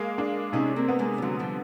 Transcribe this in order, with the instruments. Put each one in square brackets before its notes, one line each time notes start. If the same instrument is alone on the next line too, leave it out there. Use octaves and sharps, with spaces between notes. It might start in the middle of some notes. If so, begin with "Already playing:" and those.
Already playing: [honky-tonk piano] G#3 A#3
D4
[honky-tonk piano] C3 [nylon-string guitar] C#4 D#4
[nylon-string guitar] A#3 C4
[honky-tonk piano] B3
[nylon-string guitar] G#3 A#3
G3
[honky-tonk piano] D3 [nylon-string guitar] F#3 G#3
[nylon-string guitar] F3 G3